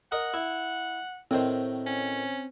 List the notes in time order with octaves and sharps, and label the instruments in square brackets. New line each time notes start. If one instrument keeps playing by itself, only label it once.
[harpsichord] A#4 D#5 [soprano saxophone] F#5
[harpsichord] E4
[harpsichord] A2 D#3 [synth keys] C4 C5
[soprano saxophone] C#4